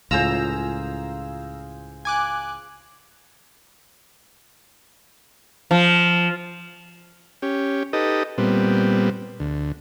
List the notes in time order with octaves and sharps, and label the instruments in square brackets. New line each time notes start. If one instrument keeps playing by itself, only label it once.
[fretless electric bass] C#2 A2 [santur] F4 G#4 C5 [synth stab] A#5 E6
[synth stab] G#5 D6 F#6
[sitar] F3
[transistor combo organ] C#4 G4
D#4 G4 A4 B4 D#5
A#2 G3 B3 C4
D2